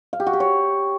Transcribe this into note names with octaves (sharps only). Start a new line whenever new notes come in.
F5
G4
F#4
G4
C#5